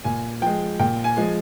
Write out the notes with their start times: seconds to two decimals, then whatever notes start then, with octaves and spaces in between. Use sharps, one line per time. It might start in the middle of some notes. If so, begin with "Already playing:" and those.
0.04 A#2 G#5
0.42 F3 G#3 G5
0.79 A#2 G5
1.04 G#5
1.17 F3 G#3